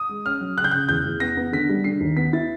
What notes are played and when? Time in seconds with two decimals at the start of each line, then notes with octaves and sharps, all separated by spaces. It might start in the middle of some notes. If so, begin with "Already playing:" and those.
Already playing: D#6
0.09 G#3
0.25 C#4 F6
0.41 F#3
0.57 C#3 F#6
0.64 G6
0.71 C#3 F#6
0.89 E2 G6
1.05 E2
1.20 B3 A#6
1.37 B3
1.53 D3 B6
1.69 G3
1.84 D3 C7
2.00 D#2
2.16 B3 B6
2.33 E4 A6